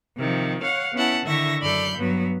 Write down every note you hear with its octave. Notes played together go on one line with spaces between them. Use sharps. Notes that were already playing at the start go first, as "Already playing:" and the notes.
C3 D#3 F3
C#5 F5 F#5
B3 C#4 E4 F#5 A5
D3 D#3 E4 E5 C#6 A#6
F#2 A4 D5 B5 F6 G6
G2 F#3 B3